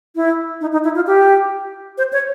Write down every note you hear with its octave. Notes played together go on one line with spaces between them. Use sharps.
E4
D#4
D#4
E4
F4
G4
C5
C#5